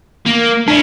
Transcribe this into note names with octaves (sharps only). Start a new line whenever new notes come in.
A#3
C#4 D4 E4